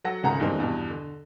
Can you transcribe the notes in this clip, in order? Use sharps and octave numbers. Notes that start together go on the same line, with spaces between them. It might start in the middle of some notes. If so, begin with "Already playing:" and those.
F#3 A4 F#5 A#6
G#1 C#2 C#3 A3 F#5 A#5
E2 G2 D#3 G#3 A3 C4
E2 G2 B2
D3